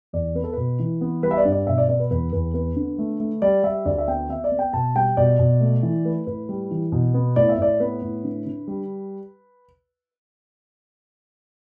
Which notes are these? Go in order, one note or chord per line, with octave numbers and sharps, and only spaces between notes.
E2 D5
B3 B4
A4
B2 B4
E3
B3
G3 B4
E5
D5
G2
D5
B2 E5
D5
B3 D5
B4
E2 B4
E2 B4
B3 B4
D3
A3
A3
G3 D5
G3 E5
D2 D5
E5
B3 G5
B3 E5
D5
B3
G5
B2 A5
G3 G5
B2 D5
B2
A3
E3
A3 B4
A2 B4
G3
E3
B2
B3
A2 D5
E5
A2 D5
B3 B4
A2
D3
D3
G3